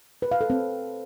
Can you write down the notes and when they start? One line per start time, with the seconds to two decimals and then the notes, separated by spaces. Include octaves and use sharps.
0.22 B4
0.31 F5
0.41 A4
0.50 C4